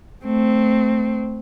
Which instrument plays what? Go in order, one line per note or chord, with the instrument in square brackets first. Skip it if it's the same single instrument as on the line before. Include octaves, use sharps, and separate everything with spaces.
[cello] A3 C4